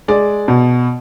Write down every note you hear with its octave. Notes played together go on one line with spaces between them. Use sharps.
G#3 D5
B2